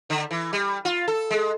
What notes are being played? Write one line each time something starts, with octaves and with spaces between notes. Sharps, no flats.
D3
E3
G3
F4
A4
G#3